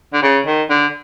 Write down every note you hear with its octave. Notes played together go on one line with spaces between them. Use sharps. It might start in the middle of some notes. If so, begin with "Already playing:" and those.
D3
C#3
D#3
D3